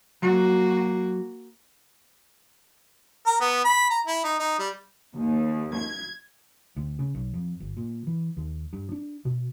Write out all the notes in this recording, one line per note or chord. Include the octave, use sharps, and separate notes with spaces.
F#3 A#3 F#4
A#4
B3
B5
A#5
E4
D#4
D#4
G3
D#2
G#6
D2
C#3
B1
F2
G1
A#2
E3
D#2
G2
D4
B2